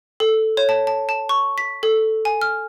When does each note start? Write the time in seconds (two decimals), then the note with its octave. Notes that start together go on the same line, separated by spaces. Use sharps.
0.20 A4
0.57 C#5
0.69 A5
0.87 A5
1.09 A5
1.29 C#6
1.58 B6
1.83 A4
2.25 G#5
2.41 F6